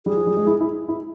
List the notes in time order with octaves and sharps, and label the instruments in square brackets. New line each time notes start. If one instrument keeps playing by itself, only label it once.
[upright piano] G3 [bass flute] G#4
[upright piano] F3
G3
G#3
E4
E4
E4